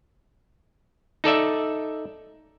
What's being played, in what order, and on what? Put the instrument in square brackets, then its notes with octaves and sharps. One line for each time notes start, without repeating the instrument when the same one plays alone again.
[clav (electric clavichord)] D#4 A4 D5 E5